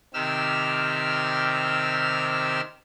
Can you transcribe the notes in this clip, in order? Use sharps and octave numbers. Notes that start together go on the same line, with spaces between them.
C3 D#3 C4 G4 E6 F6